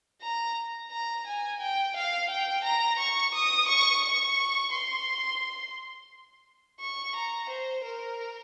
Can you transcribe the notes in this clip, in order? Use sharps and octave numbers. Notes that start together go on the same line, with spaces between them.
A#5
A#5
G#5
G5
F5
G5
A#5
C#6
D#6
C#6
C#6
C6
C#6
A#5
C5
A#4